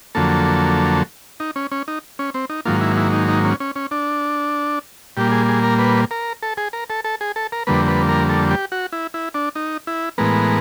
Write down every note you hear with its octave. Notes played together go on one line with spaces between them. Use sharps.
F2 D3 F#3 A#3 A4
D#4
C#4
C#4
D#4
C#4
C4
D#4
G#2 D#3 F#3 A#3 F4
E4
E4
D#4
D#4
C#4
C#4
C#4
D4
A#2 G3 A#3 G4
G#4
G#4
A#4
B4
A#4
A4
G#4
A#4
A4
A4
G#4
A4
A#4
F2 D3 G3 A#3 B4
B4
A#4
A4
G4
F#4
E4
E4
D4
D#4
E4
A2 E3 G#3 B3 A#4